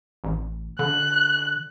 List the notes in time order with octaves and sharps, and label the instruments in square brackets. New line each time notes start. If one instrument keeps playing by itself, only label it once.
[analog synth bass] A1
[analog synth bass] D3 [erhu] F#6